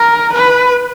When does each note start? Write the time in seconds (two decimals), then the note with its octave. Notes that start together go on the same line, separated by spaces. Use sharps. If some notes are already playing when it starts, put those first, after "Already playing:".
Already playing: A#4
0.33 B4